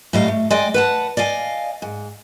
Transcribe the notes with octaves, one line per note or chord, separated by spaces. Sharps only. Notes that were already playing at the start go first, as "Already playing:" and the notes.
A2 F#3 G3 D#5 F5
A3
G#3 D5 D#5 G5 G#5
B4 F#5 A5
D5 D#5 F5 G#5
G#2